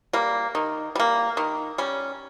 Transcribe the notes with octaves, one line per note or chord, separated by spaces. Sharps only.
G3 A#3
D#3
G3 A#3
D#3
G3 C#4